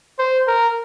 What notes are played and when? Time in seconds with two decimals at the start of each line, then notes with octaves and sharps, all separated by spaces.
0.19 C5
0.48 A#4